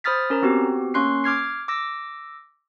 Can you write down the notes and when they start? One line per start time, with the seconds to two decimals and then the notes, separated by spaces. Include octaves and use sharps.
0.04 C5 B5 D#6 F6 A6 B6
0.30 C#4 A#4 A#5
0.42 B3 C4 F#4 G4
0.94 A#3 C#4 C6 C#6 F#6 C7
1.24 D6 F6 G#6 C7
1.68 D6 E6 A#6